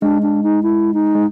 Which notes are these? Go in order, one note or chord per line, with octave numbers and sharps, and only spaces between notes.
G#3 D4
D4
D#4
E4
D#4
G#3